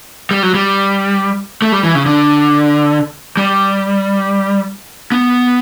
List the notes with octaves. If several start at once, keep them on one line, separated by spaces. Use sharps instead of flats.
G3
F#3
G3
A3
G3
E3
C#3
D3
G3
B3